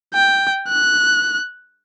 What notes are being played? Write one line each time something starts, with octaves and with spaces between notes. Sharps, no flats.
G5
F#6